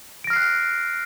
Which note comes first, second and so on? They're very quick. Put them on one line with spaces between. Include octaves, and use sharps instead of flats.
D7 A#6 F6 C7 F#6